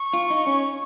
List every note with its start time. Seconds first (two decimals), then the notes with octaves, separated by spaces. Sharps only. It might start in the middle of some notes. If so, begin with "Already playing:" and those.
Already playing: C#6
0.14 F4
0.30 D#4
0.47 C#4